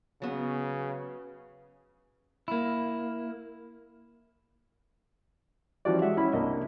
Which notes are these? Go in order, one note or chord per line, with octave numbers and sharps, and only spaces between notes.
C#3 F#3 B3
A#3 E4
E3 F3 C#4 F#4 G4 D5
G#3 E5 F#5
C#4 E4 B5
C2 A#3 D4 D#5